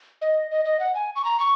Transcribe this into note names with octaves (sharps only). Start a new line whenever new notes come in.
D#5
D#5
D#5
F#5
G#5
C#6
A#5
C#6